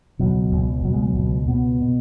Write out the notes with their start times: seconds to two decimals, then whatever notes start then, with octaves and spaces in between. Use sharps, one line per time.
0.19 C#2 B2 F#3
0.52 C#2 B2
0.83 C#2 B2 F#3
0.94 G#3
1.04 F#3
1.16 C#2 B2
1.48 C#2 B2 B3
1.81 B2